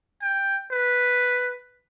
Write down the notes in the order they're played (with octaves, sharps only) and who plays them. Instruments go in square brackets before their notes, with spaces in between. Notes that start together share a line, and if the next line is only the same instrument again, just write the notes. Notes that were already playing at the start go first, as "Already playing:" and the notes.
[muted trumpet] G5
B4